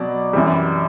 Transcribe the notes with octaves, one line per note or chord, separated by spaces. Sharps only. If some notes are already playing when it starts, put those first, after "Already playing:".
Already playing: B2 F#3 D5
F#2 E3 G3